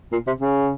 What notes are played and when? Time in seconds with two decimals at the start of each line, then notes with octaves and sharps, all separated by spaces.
0.12 A#2
0.27 C3
0.41 C#3